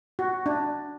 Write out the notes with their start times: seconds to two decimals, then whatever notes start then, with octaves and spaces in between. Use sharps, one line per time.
0.19 F#4
0.46 D4